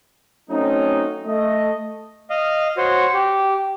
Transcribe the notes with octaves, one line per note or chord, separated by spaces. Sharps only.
F#3 A3 C4 C#4 D#4
A3 D#5
D#5 F5
F#4 C5 C#5
G4